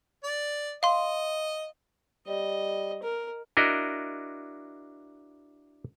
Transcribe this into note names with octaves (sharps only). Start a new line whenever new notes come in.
D5
D#5 F5 C6
G3 D#5
A#4
D4 E4 F#4 A#4 D#5